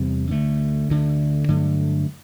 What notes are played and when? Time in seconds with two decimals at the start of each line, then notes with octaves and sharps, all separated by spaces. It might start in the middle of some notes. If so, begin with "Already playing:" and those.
Already playing: E2 C3 G3 C4
0.30 D2 D3 A3
0.89 D2 D3 A3
1.48 G2 D3 F#3 A3